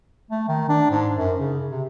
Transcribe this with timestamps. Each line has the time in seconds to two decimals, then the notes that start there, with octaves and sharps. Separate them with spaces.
0.31 A3
0.49 D#3
0.69 D4
0.91 G#2
1.17 F#2
1.39 C#3
1.71 C3